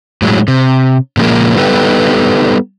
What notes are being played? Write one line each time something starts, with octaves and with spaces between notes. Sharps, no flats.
A2 F#3 G#3
C3
A#2 C#3 F3 G3 G#3 A#3
G3 B3 D#4 G4 A4 B4